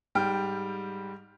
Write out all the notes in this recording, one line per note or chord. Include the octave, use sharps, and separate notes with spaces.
G#2 G3 G5 F6